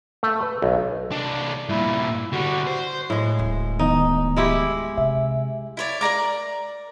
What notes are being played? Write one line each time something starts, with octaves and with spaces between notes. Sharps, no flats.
A3
B4
B1
C2 D4
G2 A#2 E4
D3 G3 F#4
C5
A2 G#3
D1
D#3 B3 D#4 D#5
G#3 E4 G4
C3 E5
E4 C#5 D5
A#4 D5 A#5 D6